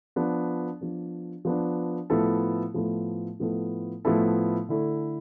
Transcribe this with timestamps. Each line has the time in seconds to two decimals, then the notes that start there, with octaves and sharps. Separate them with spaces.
0.16 F3 B3 D4
0.81 F3 B3 D4
1.45 F3 B3 D4
2.10 A2 F3 B3 E4 A4
2.74 A2 F3 B3 E4 A4
3.39 A2 F3 B3 E4 A4
4.05 A2 F3 B3 E4 A4
4.69 D3 A3 E4 A4